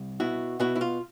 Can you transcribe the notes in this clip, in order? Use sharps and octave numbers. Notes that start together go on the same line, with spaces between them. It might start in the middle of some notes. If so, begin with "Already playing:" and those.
Already playing: C2
B2 E4 F#4
B2 E4 F#4
E4
F4